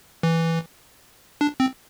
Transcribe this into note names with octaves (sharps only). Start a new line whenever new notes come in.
E3
D4
C4